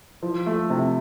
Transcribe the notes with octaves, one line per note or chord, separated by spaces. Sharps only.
F3
A3
C3